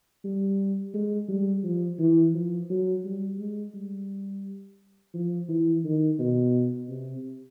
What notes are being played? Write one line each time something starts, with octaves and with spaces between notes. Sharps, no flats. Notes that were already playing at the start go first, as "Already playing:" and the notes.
G3
G#3
G3
F3
E3
F3
F#3
G3
G#3
G3
F3
E3
D#3
B2
C3